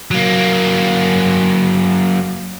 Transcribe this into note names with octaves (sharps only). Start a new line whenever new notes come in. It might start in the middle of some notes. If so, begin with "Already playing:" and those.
F#3 A#3